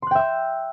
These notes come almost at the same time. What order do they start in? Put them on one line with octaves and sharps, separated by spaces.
C6 F#6 G5 E5 E6